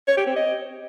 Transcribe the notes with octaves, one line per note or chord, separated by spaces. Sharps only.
C#5
G4
C4
D#5